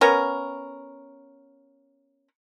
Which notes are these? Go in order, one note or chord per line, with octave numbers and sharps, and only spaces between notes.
B3 C#4 A#4